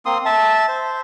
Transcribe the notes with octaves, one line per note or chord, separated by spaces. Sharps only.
A#3 C4 C6 D#6
E5 A5
C5